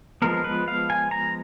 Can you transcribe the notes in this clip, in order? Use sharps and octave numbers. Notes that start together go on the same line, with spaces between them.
F3 G#3 B3 A#4
B4
F5
G#5
A#5